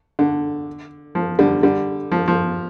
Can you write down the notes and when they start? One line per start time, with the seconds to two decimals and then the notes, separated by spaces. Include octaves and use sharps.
0.19 D3
1.15 F3
1.39 D3 G3
1.63 D3 G3
2.12 F3
2.28 F3